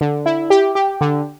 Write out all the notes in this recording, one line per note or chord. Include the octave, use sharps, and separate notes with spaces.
D3
E4
G4
G4
D3